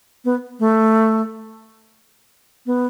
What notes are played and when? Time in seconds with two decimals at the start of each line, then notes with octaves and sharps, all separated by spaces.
0.25 B3
0.60 A3
2.66 B3